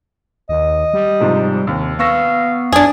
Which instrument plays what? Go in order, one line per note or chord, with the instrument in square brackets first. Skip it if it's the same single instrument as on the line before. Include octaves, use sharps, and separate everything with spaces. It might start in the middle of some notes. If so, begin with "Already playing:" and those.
[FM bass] D#2 [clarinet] D#5
[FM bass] G3
[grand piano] G#2 C3 F3
[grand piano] D#2 [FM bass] C3
[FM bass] B3 [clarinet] F5 [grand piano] C#6 E6 A#6
[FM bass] F#2 [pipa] D4 G#4